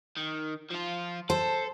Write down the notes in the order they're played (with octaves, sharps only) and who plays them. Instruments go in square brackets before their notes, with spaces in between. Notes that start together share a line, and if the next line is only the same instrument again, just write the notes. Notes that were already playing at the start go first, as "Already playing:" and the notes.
[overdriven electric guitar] D#3
F3 F4
[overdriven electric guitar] A4 [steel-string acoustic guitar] C5